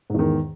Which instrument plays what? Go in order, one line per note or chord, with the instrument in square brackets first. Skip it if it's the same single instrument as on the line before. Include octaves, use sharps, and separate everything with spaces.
[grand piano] G#2
E2
D#3